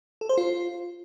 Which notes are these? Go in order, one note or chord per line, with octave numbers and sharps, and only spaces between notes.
A4
C5
F4